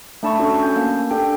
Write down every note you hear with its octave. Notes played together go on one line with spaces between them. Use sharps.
A3 D4 A5 B5 C#6
C#4 D4 F#4 A4
C#4 G#5 G6
A#3
D4 G4 A4 G5